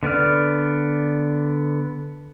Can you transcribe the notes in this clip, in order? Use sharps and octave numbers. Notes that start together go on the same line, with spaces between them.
D3 B3 D5 F6